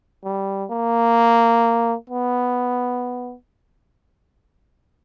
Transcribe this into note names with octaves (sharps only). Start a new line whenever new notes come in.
G3
A#3
B3